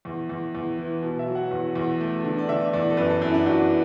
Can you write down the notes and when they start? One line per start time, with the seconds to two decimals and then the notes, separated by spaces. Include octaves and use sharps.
0.05 E2
0.29 E2
0.55 E2
0.78 E3
1.02 B2
1.19 E5
1.27 F#3
1.35 F#5
1.51 E2
1.75 E2
2.00 A3
2.25 D3
2.38 D5
2.49 D3 E5
2.73 E2 D5
2.90 A4
2.97 F#2 B4
3.10 A4
3.21 F#2 E4
3.34 D4
3.46 F#2 F#4